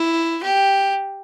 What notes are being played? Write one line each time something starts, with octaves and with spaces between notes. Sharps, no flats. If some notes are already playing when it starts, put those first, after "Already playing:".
Already playing: E4
G4